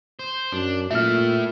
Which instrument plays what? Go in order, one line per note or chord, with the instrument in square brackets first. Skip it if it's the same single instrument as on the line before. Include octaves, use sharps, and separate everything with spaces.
[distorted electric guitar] C5
[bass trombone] F#2 [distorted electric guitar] D4
[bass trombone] A#2 [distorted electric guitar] A3 E4 [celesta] E5 F6